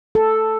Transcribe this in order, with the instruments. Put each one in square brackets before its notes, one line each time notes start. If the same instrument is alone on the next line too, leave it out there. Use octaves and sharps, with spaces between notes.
[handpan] A4